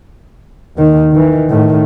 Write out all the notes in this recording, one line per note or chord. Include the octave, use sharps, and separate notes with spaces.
D#2 D#3
D#3 E3
A2 D#3